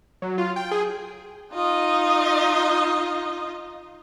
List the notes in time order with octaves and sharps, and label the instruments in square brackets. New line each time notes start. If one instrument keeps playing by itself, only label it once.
[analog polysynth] F#3
F4
G5
G#4
[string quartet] D#4 F4 D#5